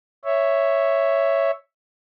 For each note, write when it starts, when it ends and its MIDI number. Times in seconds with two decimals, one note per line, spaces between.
0.25 1.51 73
0.25 1.51 76